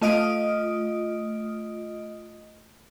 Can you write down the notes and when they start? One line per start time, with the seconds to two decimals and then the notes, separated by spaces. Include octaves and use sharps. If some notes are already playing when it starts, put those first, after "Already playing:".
0.01 A3 F4 D#5 D#6 F6 D7